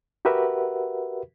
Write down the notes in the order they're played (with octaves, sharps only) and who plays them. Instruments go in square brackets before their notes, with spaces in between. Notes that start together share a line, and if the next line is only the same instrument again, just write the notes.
[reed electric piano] F#4 G4 A#4 B4 E5 F#5